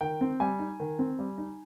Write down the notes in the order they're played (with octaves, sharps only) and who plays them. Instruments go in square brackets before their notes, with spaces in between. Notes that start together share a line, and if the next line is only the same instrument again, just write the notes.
[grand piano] D#3 G5
C4
G3 G#5
D#4
D#3
C4
G3
D#4